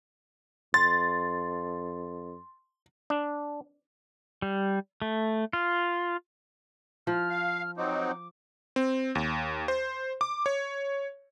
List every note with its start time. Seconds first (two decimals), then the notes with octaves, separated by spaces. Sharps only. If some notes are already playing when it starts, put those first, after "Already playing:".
0.74 F2 C6 A6
3.10 D4
4.42 G3
5.02 A3
5.53 F4
7.07 F3 F6
7.30 F5
7.77 F#3 C4 D#4 D6
8.76 C4
9.15 D#2
9.68 C5
10.21 D6
10.46 C#5